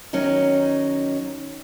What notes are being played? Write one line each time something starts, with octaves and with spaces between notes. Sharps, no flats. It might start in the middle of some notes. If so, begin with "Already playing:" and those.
D#3 F#3 C#4 D#4